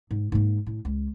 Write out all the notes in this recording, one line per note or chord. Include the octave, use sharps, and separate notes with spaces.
G#2
G#2 A#3
A2
C#2